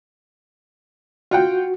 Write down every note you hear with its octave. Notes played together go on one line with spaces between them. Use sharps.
F4 F#4 F#5 G5